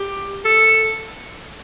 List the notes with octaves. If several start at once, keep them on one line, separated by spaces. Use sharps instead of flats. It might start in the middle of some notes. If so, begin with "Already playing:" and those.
Already playing: G4
A4